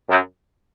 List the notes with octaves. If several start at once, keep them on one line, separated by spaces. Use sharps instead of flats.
F#2